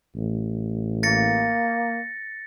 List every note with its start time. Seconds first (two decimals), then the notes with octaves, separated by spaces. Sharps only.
0.16 A1
1.03 A#3 A6 A#6 C#7